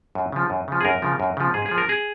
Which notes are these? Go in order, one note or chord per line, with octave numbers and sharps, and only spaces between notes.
F#2
C#3 F3
F#2
C#3 F3
G#4
F#2 A#4
C#3 F3
F#2
C#3 F3
G#2 G#4
G#4
F3
A#4
G#4